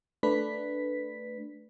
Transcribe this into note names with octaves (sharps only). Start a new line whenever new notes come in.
A3 D4 B4 B6